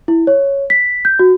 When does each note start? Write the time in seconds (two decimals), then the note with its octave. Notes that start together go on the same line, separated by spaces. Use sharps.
0.08 E4
0.27 C#5
0.70 B6
1.05 G6
1.19 F#4